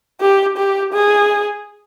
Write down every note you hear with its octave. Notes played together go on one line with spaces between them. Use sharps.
G4
G4
G#4